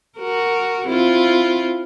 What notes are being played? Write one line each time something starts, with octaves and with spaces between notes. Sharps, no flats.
F#4 A#4
C4 E4 F4